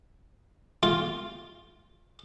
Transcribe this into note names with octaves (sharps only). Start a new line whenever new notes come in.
F4